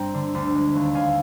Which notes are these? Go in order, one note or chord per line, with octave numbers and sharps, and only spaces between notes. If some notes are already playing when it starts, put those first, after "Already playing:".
Already playing: G2 G3 C4 G5 A#5
D3
D2
G#3
D#2
D3 F5 G#5